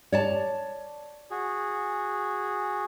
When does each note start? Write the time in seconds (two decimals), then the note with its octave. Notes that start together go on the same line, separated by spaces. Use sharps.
0.12 C#5 D5 A5
1.31 F#4 G#4